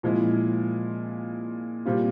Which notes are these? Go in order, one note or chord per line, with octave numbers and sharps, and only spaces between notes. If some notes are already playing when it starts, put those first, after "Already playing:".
A#2 F3 G#3 C4 E4
A#2 G3 C4 F4